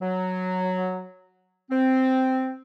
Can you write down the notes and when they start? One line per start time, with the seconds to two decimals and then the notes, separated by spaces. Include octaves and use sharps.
0.01 F#3
1.71 C4